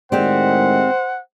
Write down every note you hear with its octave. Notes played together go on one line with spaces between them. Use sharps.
A2 D#3 G#3 C4 G4 C5 D5 F#5